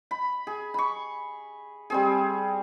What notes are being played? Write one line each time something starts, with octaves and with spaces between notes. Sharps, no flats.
B5
G#4
B5 C#6
G3 C4 G#4